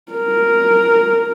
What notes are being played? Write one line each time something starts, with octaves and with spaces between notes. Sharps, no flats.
A#4